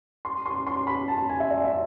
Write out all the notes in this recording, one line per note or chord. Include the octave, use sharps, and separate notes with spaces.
C6
C6
C6
B5
A5
G#5
E5
D5
E5